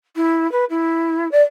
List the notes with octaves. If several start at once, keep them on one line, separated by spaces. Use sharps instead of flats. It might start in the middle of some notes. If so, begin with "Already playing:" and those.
E4
B4
E4
D5